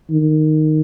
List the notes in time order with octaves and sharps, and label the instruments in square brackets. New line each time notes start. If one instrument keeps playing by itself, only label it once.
[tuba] D#3